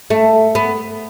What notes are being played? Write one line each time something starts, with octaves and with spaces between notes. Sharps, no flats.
A3
B3